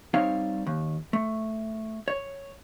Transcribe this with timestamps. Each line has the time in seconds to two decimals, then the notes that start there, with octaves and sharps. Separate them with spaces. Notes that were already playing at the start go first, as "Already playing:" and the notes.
0.14 G3 C4 D#4 C#5 F5
0.66 D#2
1.13 A3
2.08 C#5